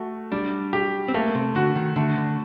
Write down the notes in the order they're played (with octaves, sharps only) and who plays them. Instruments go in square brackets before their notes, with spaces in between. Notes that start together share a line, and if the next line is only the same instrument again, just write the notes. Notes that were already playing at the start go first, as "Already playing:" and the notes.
Already playing: [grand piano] A3 F#4
[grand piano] G3 [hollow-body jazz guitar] D4
[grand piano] G4
[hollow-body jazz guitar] C4
[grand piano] A3 [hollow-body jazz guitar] A#3
[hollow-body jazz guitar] C3
[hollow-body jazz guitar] D3 [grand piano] F#4
[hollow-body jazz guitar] D#3
[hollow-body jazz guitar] D3 [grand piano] A3
[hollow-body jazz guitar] D3